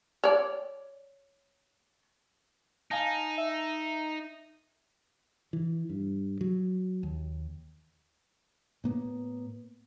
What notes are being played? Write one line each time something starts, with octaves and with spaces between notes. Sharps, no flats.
C#5 D5
D#4 F5 G#5 A5
E5
E3
G2
F#3
D#2
A2 A#3 B3